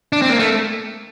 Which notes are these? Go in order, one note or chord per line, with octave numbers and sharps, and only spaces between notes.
D4
C4
A#3
A3